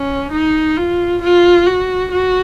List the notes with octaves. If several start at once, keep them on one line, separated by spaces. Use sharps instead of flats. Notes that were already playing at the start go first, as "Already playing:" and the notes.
Already playing: C#4
D#4
F4
F4
F#4
F#4